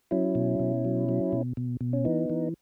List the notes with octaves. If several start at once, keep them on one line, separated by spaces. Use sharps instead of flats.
F#3 C#4 E4
B2
B2
F#3
F#3
B2
B2
B2
C#4
E3 B3 D#4
E3